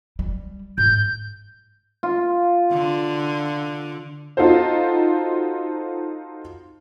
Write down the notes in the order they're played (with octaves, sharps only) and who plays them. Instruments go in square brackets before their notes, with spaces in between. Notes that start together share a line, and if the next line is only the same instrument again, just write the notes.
[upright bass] G3
[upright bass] G#2 [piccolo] G6
[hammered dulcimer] F4
[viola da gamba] D3
[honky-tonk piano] D#4 F4 F#4 A4 C5